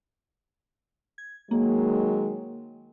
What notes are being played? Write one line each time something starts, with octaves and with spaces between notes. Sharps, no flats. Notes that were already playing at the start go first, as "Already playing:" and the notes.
G#6
D#3 F#3 G#3 A#3